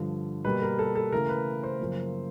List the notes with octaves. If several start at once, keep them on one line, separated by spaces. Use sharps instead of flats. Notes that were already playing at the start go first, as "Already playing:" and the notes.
Already playing: G2 D3 F3
B2 G3 A#3 B4
A#4
A4
A4
C#3 E3 A3 A#4
B4
C5
F#2 C#3 F3 A#3